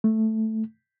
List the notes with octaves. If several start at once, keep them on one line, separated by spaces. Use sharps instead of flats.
A3